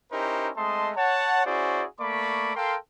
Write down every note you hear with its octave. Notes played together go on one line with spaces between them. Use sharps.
C#4 D#4 E4 G4 A#4 C5
G#3 A3 C4 D#5 A5 C6
C#5 F#5 A5
C#4 E4 F#4 G#4 C5 D5
A3 A#3 D5 B5 C#6 D6
A4 A#4 F5 G5 C6